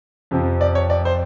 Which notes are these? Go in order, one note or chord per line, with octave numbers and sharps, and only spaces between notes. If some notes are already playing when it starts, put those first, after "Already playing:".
F2 C3 F3
D5
C#5
D5
C5